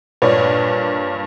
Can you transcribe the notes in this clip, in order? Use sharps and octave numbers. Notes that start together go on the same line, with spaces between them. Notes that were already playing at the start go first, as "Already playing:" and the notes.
G2 A#2 B4 C#5 D5